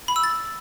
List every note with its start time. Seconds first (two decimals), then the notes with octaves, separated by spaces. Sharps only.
0.08 B5
0.16 E6
0.23 A6